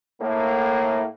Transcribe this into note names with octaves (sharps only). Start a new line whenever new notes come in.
A2 A#3